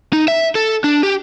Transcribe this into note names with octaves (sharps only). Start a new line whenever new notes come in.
D#4
E5
A4
D4
G4